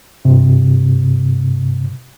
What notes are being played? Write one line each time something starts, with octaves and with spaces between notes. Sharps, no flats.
G2 C3